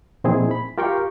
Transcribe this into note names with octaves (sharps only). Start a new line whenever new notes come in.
A#2 F3 C4 D#4 E4 G#4
B5
F4 G4 A#4 F5 G5 C#6